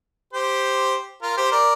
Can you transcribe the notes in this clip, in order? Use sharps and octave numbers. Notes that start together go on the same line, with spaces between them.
G4 C5
F4 A#4
G4 C5
A#4 D5